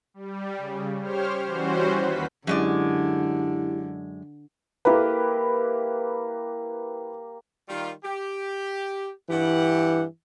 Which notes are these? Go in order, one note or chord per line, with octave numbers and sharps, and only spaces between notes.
G3
C#3
G4 C5 C#5 F6
E3 G3 C#4 F#4 C5
D#2 B4 B6
F#2 D3 G#3 E4 G4 D5
A#3 E4 G4 B4
D#3 G3 F4
G4
G2 E3 G4 F#5